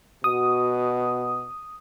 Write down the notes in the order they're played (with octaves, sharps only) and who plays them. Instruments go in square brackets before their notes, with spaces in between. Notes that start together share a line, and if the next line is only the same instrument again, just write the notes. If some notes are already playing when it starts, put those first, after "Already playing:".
[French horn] B2 [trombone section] F#4 [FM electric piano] D#6